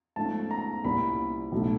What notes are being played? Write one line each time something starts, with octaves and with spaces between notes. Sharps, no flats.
G#2 F3 A3 C#4 A5
A#5
C2 A#2 G3 A#3 C#4 B5
B1 A2 F#3 A3 C#4